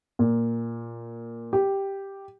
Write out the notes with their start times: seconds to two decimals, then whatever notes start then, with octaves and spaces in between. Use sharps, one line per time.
0.19 A#2
1.53 G4